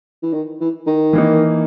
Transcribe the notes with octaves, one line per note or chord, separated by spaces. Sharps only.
E3
D#3
E3
D#3
E3 A#3 D#4